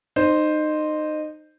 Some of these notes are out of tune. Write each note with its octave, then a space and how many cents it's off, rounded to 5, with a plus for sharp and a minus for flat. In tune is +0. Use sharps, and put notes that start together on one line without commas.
D#4 -20 C5 +0